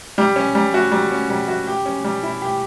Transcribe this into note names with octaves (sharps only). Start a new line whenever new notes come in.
G3
C#4
G3
F#4
G3
C#4
G3
F#4
G4
C#4
G3
E4
G4